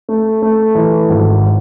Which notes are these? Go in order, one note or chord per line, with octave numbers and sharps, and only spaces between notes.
A3
A3
E3
G#1